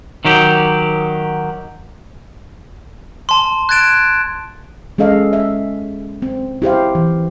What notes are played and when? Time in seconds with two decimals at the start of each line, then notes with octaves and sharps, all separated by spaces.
0.25 D#3 F#3 G4
3.29 A5 C6
3.69 F#6 G#6 A6 D7 E7
4.98 G#3 C#4 A4 D#5 F5
5.33 E5
6.22 C4
6.62 E4 G4 C5 F5
6.95 E3